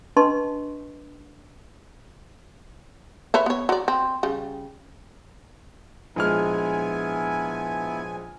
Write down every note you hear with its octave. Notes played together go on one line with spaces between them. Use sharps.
D4 B4 D#5 A5 C6 C#6
B4 C#5 E5
B3 C#5
F#3 D5
C4
C#3 G3
A#1 G#3 B3 E4 G#5 F6